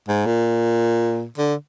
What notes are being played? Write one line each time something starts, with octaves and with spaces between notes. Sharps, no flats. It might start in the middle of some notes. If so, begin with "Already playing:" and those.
G#2
A#2
D3